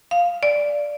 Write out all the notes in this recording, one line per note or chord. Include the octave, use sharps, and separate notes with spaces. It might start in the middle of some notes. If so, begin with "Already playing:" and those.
F5
D5